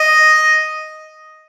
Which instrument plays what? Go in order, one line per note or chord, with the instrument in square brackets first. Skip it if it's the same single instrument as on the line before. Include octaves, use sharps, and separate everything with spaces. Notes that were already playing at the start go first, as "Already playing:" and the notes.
Already playing: [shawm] D#5